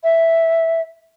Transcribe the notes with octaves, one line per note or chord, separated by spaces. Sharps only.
E5